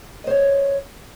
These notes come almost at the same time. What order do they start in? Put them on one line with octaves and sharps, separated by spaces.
D#5 C5 C#5